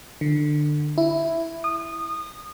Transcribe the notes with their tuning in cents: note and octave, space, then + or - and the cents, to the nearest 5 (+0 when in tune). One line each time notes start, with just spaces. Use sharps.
D3 +25
E4 +5
D#6 -25